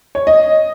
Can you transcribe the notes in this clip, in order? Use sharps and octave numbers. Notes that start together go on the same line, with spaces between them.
C#5
D#5